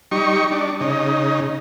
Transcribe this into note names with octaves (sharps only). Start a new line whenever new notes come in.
G3 D#4 C#6
D4
C#3 D#4